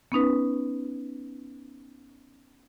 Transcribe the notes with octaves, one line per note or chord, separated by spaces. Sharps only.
B3 C#4 D#4 B4